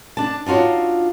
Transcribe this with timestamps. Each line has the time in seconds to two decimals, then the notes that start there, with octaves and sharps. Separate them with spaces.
0.17 D4 A5
0.46 D4 D#4 F4 F#4 C#5